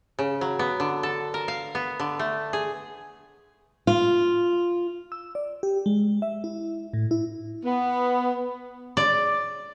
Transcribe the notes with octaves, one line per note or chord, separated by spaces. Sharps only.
C#3
F#3
B3
D3
A4
A#4
F5
B3
D3
A3
G#4
F4
E6
D5
G4
G#3
E5
E4
A2
E4
B3
D5